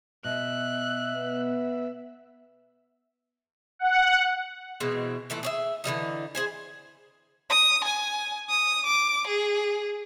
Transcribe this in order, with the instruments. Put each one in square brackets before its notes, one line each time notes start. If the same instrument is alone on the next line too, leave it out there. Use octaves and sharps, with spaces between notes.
[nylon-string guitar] B2 [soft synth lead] E5 [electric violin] F#6
[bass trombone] B3
[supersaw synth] F#5
[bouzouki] B2 E3 G#3 C4
A#2 E3 A3
G#4 C#5 E5
D3 E3 G3 D#4
G#4 C5 G#5
[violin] D#6
G#5
D#6
D6
G#4